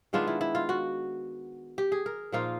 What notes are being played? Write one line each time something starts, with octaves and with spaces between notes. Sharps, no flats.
D#3 G#3 B3 D4 F4
E4
E4
F4
F#4
G4
G#4
A#4
A#2 F3 A#3 D#4 F4